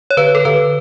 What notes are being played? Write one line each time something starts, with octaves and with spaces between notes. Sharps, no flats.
C#5
D3 B4
A4
D3 B4